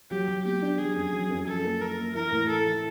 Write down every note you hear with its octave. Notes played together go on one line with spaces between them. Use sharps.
F#3 G4
F#3
B3 G4
D4
F#3 G#4
F#2
F#3
F#2
F3 A4
A#3
A#3 A#4
A#3
E3 A#4
A2
E3 A4
E3